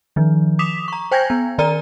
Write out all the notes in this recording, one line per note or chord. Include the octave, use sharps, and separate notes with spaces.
D#3 F3
D6 D#6 B6 E7 F7
A#5 C#6
C5 G5 G#5 G6 G#6 A#6
B3
D#3 A#4 D5 A#5 F6 D#7